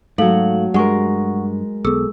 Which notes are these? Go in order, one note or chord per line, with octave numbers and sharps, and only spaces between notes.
G#2 F#3 A3 A4 F5 F#7
G2 G#3 A#4 F#5 C#6
B1 B3 G#4 A4 E6